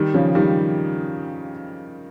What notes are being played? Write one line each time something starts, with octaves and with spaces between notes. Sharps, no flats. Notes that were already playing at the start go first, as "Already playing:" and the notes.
Already playing: D#3 G3
C#3 F3
D#3 G3